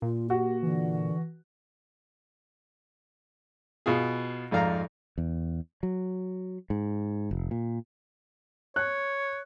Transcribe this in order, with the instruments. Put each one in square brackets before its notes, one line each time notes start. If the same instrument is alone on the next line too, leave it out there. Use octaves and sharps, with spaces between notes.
[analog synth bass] A#2 [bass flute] F4
[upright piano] F#4 [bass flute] G4
[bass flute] D3 [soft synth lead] E3
[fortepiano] B2 F4 G#4
G#1 F2 D5 F5 A#5
[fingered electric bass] E2
F#3
G#2
F1
A#2
[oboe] C#5 [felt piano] F#6